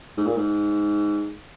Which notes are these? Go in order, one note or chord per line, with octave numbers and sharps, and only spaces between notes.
G#2
A#2
G#2